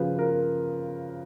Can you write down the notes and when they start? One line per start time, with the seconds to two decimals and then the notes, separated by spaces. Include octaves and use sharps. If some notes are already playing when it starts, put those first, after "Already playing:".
Already playing: C#3 F3 B4
0.19 A#4